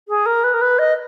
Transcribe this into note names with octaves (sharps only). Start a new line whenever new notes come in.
G#4
A#4
B4
A#4
B4
D#5